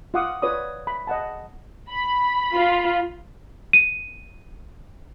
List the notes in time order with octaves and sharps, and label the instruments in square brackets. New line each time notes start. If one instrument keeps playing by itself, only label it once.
[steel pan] F4 F5 F#5 D6 D#6
F4 B4 C#5 D5 D#6
B5
D#5 F#5 A5
[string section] B5
[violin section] F4
[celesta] D#7